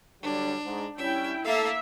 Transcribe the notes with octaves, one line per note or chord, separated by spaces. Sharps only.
D3 F#3 G3 D4
G#2
G3 C#4 E4 E5 G5
A3 A#3 A4 E5 F5